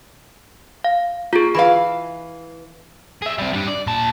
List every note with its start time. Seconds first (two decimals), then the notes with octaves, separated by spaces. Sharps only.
0.84 F5
1.33 A#3 F4 G#4
1.55 E3 B4 F5 B5
3.22 G#4 E5
3.38 G3 C4
3.53 G3 D4
3.67 D5
3.87 A#2 A5